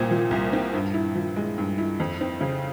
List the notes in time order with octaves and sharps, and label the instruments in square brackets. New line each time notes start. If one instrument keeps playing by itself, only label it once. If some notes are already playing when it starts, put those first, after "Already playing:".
Already playing: [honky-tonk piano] C2 A#2 C4
F3
C2
C4
G2
E4
F3
G#3
G2
E4
F2
C4
C#3